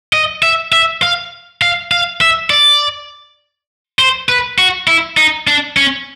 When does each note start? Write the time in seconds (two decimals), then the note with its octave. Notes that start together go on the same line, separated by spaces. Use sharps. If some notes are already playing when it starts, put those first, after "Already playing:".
0.13 D#5
0.43 E5
0.73 E5
1.02 F5
1.62 F5
1.92 F5
2.21 E5
2.50 D5
3.99 C5
4.29 B4
4.58 F#4
4.87 E4
5.17 D#4
5.47 D4
5.77 C#4